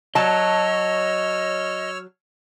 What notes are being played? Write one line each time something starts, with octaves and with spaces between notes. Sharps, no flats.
F#3 C#5 D#5 A5 E6 F6